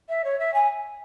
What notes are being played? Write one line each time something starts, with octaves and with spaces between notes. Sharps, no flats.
E5
C#5
E5
G#5